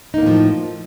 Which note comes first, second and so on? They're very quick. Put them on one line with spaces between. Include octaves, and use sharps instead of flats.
D#4 A#3 A2 F3